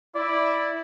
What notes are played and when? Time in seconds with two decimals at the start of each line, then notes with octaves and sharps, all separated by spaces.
0.15 E4 D5